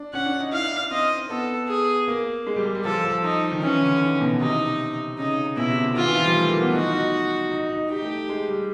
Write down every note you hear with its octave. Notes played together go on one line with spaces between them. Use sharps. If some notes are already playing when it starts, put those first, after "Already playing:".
Already playing: D4
C#4 F#5
D4
D#4
E4 F5
D4
C4 D#5
B3 A4
G#4
A#3
G#3
G3
G#3
G3
F3 A4
F3
D#4
D#3
E3 C#4
D3
D#3
B2
C3 D#4
C#3 D#4
B2 E4
C3
D3
D#3 F4
E3
F3
G3
A3
A#3
B3
D#4 F#4
D#4
D#4
D#4
D#4 G4
A3
G#3
G3